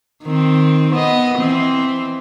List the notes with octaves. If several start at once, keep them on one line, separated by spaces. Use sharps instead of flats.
D#3 C4
B3 D#5
E3 C4